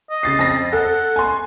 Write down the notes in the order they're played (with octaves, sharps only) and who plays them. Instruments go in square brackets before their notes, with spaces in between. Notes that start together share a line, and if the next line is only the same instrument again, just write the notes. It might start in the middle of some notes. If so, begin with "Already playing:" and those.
[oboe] D#5
[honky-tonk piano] C#3 A6 C7
F2 A#6
[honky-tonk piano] A4 [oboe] F#5
[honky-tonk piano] G#5 C6